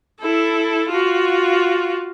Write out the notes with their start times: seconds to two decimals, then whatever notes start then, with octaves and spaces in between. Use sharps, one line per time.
0.20 E4 A4
0.89 F4 F#4